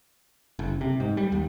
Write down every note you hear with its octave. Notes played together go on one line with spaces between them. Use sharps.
F#1
C3
G#2
G3
D#2